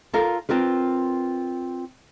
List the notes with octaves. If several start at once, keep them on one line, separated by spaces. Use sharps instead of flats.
F4 A4 A#4 C#5 F5
C4 F4 A#4 B4